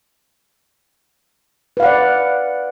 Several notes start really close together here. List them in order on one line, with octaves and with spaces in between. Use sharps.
B4 F5 F#5 D5